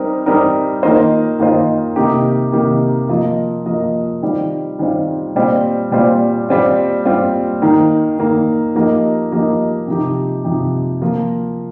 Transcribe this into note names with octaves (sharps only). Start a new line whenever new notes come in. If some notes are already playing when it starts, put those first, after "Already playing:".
Already playing: G3 C4 D#4 A#4
G3 C4 D#4 A#4
D#3 A#3 F4 C5 D#5
D#3 A#3 F4 C5 D#5
C3 D#3 A#3 D#4 G4
C3 D#3 A#3 D#4 G4
F3 A#3 F4 D#5
F3 A#3 F4 D#5
D#3 G3 C4 F4
D#3 G3 C4 F4
A#2 G3 C4 F4 C5
A#2 G3 C4 F4 C5
G3 C4 F4
G3 C4 F4
D#3 A#3 D#4
D#3 A#3 D#4
F3 A#3 D#4 G4 D#5
F3 A#3 D#4 G4 D#5
C3 F3 D#4 G4
C3 F3 D#4 G4
F3 A#3 F4